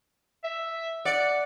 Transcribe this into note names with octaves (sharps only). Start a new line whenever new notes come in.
E5
D5 F#5